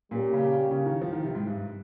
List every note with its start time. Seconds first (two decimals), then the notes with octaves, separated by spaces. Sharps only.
0.11 A#2 G3 A#3 C#4 G4 A#4
0.33 C#3
0.71 C#3
0.86 D#3
1.01 F3
1.13 D#3
1.24 C3
1.35 G#2
1.46 G2